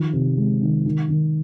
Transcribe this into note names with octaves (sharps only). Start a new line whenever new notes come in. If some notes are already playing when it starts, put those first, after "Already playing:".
Already playing: D#3 F3
C3
G#3
D#3
D#3
D#3